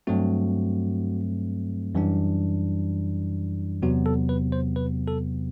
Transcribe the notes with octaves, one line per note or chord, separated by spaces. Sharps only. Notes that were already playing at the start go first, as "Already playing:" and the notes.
G2 F#3 A3 C4 F#4
F#2 E3 G3 D4
E2 C3 F#3 B3 F#4
A4
B4
C5
B4
A4